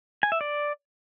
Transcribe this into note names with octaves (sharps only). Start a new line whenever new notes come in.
G#5
E5
D5